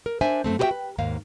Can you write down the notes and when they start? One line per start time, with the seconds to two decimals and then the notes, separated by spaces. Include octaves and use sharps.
0.06 A#4
0.21 D4 C5 E5 G#5
0.44 F#2 D3 A3 C4
0.59 F#4 G4 B4 D#5 E5 G5
0.71 B4
0.98 D#2 G#2 A#3 F5